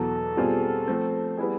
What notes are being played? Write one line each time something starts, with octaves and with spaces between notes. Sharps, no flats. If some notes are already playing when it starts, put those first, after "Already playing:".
Already playing: E2 B2 F#3 A4
B2 G3 C4 F4 G#4
F3 A3 C4
G3 B3 E4 G#4